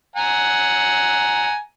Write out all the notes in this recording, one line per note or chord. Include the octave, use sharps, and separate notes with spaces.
F#5 G#5 A#5